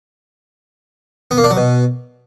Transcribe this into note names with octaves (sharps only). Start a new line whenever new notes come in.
B3
A#3
D4
F#3
B2